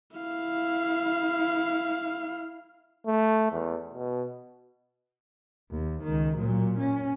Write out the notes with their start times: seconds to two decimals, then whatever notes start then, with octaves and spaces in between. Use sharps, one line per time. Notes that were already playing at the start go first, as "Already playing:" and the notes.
0.17 E4 F5
3.06 A3
3.52 E2
3.93 B2
5.71 D#2
6.03 C#2 D#3
6.37 A#2 F#3
6.79 C#4